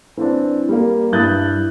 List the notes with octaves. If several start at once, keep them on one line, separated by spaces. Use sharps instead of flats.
E3 C4 D4
G3 A#3
G2 E4 D#6 F#6 G6 A6